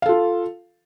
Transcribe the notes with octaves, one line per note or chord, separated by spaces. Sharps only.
F4 A4 F5